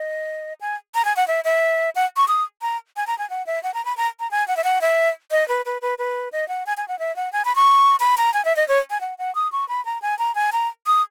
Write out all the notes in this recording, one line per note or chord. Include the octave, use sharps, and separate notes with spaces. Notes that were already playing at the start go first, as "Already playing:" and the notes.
Already playing: D#5
G#5
A#5
G#5
F#5
E5
E5
F#5
C#6
D#6
A#5
G#5
A#5
G#5
F#5
E5
F#5
A#5
B5
A#5
A#5
G#5
F#5
E5
F#5
E5
D#5
B4
B4
B4
B4
D#5
F#5
G#5
G#5
F#5
E5
F#5
G#5
B5
C#6
B5
A#5
G#5
E5
D#5
C#5
G#5
F#5
F#5
D#6
C#6
B5
A#5
G#5
A#5
G#5
A#5
D#6